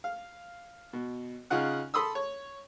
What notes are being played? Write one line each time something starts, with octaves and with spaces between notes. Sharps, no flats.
F5
B2
C#3 D#4 F4 F#5 F#6
A4 B5 C6 D#6 E6
C#5